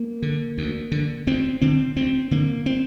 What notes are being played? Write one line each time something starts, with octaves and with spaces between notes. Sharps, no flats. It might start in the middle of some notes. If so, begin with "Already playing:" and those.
Already playing: A#3
D3
D2
D3
D2 C4
D3 C4
D2 C4
D3 A#3
C4